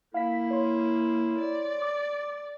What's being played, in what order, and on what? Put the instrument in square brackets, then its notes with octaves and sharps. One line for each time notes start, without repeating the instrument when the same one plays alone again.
[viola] A#3 [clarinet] E4 [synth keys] F5 B6
[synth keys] C#5 C6
[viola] D5
[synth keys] D6